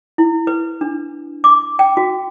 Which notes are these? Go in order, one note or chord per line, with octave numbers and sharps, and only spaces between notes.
E4
B4
D4
D6
G5
F#4